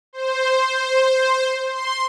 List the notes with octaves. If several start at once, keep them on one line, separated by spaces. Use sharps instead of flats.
C5
C6